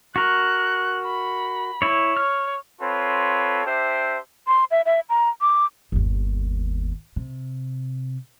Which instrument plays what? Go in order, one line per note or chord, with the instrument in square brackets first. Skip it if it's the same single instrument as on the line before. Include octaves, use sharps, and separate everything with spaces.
[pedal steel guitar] F#4 A#4 [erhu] F#6
[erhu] B5
[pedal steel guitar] E4 C#5
[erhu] C#5 [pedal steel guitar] F6
[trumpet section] C4 F4 A4 B4 C#5
D4 G4 C5 E5
[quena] C6
E5
E5
A#5
D6
[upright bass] G1 D#2
C3